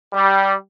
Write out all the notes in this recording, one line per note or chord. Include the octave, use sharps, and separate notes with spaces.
G3